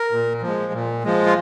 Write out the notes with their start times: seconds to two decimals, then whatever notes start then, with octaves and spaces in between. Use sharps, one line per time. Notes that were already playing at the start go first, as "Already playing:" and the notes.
Already playing: A#4
0.11 A#2
0.42 F3
0.47 G#3
0.73 A#2
1.04 F3 G#3
1.26 F4